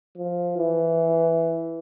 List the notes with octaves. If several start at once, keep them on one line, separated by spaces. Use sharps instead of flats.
F3
E3